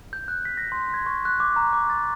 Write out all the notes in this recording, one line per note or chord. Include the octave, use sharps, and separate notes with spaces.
G6
F#6
B6
A#6
C6
G#6
C#6
F#6
D6
A#5
D6
A6